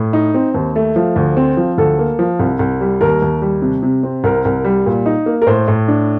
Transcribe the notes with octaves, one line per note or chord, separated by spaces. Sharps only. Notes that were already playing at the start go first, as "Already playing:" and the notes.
Already playing: A2
D#4
C4
D#2
A3
F3
D2
C4
F3
D2 A4
A#3
F3
C2
C2
G3
D#2 A#4
D#2
G3
C3
C3
C4
C2 A#4
C2
G3
A#2
D#4
A#3
A#4
A2 C5
A2
D4